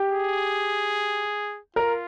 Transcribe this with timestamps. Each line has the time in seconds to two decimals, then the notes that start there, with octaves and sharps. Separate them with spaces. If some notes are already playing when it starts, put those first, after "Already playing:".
Already playing: G4
0.09 G#4
1.76 F4 A#4